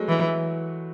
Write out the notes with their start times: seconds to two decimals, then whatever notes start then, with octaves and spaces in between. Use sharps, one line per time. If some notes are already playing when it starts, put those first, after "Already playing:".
Already playing: F#3 G#3 A3 B3
0.09 E3